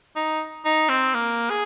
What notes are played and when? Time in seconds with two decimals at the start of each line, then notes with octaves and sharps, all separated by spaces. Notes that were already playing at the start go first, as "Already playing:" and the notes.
0.16 D#4
0.65 D#4
0.89 C4
1.14 A#3
1.50 G#4